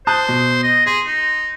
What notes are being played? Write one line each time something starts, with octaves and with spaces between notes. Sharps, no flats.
C5 A5 D#6 F#6
B2
D#5
G#4 C6
D#4